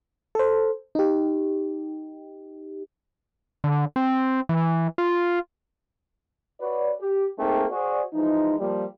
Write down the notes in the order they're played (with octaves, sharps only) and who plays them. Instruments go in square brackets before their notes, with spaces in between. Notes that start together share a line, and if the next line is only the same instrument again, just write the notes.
[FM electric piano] A4 C5
D#4 G4
[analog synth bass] D3
C4
E3
F4
[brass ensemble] F#4 B4 C#5 D5
G4
A3 A#3 C4 D#4 G#4 G5
F#4 G#4 C5 D5
E3 F3 G#3 D#4
F3 G3 A#3